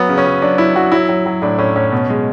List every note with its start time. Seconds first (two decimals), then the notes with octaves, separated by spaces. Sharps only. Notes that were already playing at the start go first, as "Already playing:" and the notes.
Already playing: F#3 B3
0.09 C#3
0.18 C#4
0.25 F#3
0.42 F#3 D4
0.58 F#3 E4
0.75 F#3 F#4
0.92 F#3 E4
1.09 F#3
1.26 F#3
1.42 A2 D4
1.58 A2 C#4
1.76 A2 C#4
1.92 B2
2.10 G#3